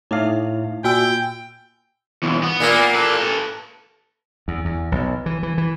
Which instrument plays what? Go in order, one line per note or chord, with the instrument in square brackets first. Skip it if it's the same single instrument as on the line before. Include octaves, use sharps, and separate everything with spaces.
[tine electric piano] A2 F5 [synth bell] D#4 E4 E5
[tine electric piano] A#2 [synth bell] F#4 G#5 E6 [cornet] G5
[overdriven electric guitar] B1 E2
B3
[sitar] A#2 A#3
[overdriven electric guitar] A4 B4
[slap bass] E2
E2
B1
E3
E3
E3